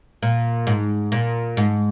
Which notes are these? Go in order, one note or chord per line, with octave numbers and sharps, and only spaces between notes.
A#2
G#2
A#2
G#2